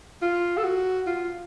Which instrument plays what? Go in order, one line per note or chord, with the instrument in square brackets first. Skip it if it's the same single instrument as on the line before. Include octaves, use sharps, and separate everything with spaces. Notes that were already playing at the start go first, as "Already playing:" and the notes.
[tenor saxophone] F4
A4
F#4
F4